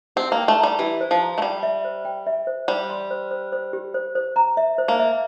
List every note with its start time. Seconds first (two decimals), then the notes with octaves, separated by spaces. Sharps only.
0.16 C4 G4
0.32 A#3
0.38 G5
0.48 A3
0.59 G3 A#5
0.79 E3 G4
1.01 C5
1.11 F3
1.22 A#5
1.38 A3
1.42 G3 G5
1.63 E5
1.85 C5
2.05 G5
2.27 E5
2.47 C5
2.68 G3 C5
2.90 C6
3.11 C5
3.31 C5
3.52 C5
3.73 G4
3.94 C5
4.15 C5
4.36 A#5
4.57 E5
4.78 C5
4.88 A#3
4.99 E5